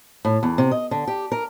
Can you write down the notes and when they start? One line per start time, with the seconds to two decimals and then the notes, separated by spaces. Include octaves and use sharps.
0.25 A2
0.43 E2
0.58 C3
0.71 D#5
0.91 D3
1.07 G4
1.32 A#4